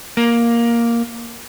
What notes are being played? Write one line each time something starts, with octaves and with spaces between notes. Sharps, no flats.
A#3